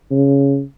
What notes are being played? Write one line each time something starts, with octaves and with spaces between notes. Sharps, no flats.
C#3